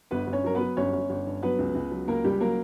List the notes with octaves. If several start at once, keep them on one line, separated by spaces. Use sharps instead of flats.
G1 B3 B4
G1
C#4 C#5
F#3 A#4
B3 B4
F#3
G1 C#4 C#5
G1
G1
G2
F#3 B3 B4
C#2
C#2
F#3
C#2 A#3 A#4
C#2 G3 G4
F#3 A#3 A#4